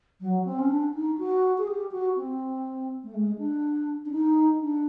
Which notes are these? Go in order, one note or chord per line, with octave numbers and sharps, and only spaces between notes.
F#3
C4
C#4
D4
D#4
F#4
G#4
G4
F#4
C4
A3
G#3
D4
D4
D#4
D4